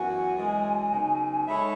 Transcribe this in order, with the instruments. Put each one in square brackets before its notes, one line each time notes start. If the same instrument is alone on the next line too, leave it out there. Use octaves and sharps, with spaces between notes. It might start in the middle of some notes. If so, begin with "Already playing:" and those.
Already playing: [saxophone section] F#2 E3 B3 F#4 [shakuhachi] G#5
[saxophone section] F#2 E3 G#3
C#3 F#3 B3 D#4
[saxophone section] G#3 D#4 A4 C#5 E5 [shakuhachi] B5